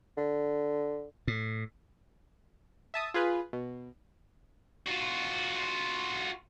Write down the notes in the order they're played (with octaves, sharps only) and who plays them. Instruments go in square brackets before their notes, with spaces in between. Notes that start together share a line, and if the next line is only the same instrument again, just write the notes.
[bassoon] D3
[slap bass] A2
[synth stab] E5 A5 D#6
F4 G#4 B4
B2
[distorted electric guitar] F4 F#4